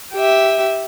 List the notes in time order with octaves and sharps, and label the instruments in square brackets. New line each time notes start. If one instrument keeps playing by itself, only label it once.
[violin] G4 E5